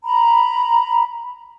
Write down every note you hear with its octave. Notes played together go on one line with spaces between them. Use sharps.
A#5 B5